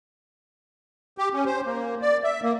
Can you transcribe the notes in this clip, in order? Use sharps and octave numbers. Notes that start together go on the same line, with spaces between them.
G4
C#4
C5
A#3
D5
E5
A#3